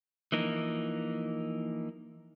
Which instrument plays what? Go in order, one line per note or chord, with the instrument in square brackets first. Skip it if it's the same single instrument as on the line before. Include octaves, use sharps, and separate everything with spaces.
[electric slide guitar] E3 F3 A#3 D#4